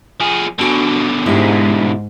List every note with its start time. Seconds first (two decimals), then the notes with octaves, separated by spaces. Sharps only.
0.20 F3 G#4
0.59 B2 D3 D4 F#4 G#5
1.26 G#2 E4 G4